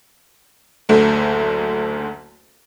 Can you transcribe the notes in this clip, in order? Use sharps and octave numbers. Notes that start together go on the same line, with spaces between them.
F#1 D2 D3 A3